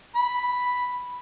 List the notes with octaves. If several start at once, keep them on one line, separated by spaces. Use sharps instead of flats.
B5